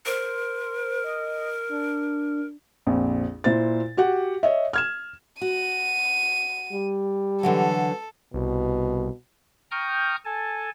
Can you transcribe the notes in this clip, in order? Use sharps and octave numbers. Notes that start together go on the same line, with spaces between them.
A#4 C5
D#5
D4
A#1 F2
A#2 E4 C5 A6
F#4 G4 F#5
C#5 D#5 E5
F6 G#6 E7
F#4 D#7
G3
D3 E3 F#3 A4
C2 B2
G5 A#5 C#6 D#6 F6 G6
A4 G#5 A5